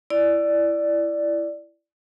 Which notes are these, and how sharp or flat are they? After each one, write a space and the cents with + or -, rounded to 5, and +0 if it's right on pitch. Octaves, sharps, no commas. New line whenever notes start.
E4 +15 D5 +0